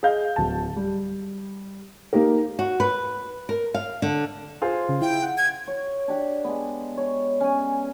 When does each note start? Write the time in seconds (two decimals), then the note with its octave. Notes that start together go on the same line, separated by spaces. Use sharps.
0.03 G#4 D#5 F5 G6
0.36 D1 A5
0.76 G3
2.13 A#3 D#4 G4 A#4
2.59 F#4
2.80 B4
3.49 A#4
3.74 F5
4.02 D3
4.62 F4 G#4 C5
4.89 C#3
5.02 E4 G5
5.23 F#5
5.38 G#6
5.67 C#5
6.08 D4 G4 F#5
6.44 G#3 B3
6.97 C#5
7.40 C#4 G#5